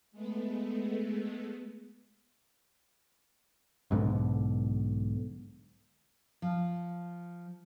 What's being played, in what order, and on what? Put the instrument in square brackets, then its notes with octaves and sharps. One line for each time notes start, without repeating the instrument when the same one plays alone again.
[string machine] G#3 A3 B3
[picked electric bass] B1 G#2 B2 D3
[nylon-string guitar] F3